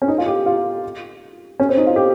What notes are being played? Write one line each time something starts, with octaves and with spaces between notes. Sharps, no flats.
C#4
D#4
F4
G4
F4
C#4
C4
D#4
F4
G4